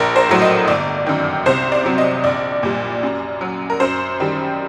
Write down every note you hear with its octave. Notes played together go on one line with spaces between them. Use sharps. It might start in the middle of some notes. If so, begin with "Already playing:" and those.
Already playing: A#1 A#4
C5
A2 F#3
D#5
G1 D5
F#2 D#3
C2 C5
D5
C3 F#3
D#5
A#1 D5
A#2 G3
F#2
F#3
A#4
F#2 C5
D#3 G3